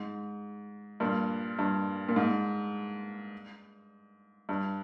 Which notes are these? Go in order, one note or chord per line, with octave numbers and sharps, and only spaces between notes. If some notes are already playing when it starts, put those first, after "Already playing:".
Already playing: G#2
G2 A#2
G2
A#2
G#2
G2